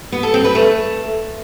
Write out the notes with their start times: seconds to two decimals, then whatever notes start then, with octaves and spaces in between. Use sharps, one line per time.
0.12 B3
0.23 A4
0.34 C4
0.44 B4
0.55 A3